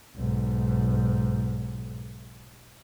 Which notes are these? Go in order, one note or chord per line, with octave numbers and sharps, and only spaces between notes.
B1 G#2